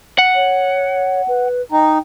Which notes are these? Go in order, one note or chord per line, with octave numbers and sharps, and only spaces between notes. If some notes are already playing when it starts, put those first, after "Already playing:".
F#5
C#5
B4
D#4 G5